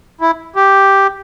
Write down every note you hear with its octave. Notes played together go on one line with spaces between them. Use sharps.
E4
G4